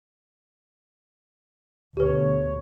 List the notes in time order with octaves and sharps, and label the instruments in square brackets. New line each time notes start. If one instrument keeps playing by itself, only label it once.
[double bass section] D2 B2 [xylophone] G4 B4 [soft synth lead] C#5